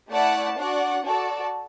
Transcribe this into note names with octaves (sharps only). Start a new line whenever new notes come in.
A3 E4 D5 F#5 A5
D4 F#4 D5 F#5
F#4 A4 D5 A5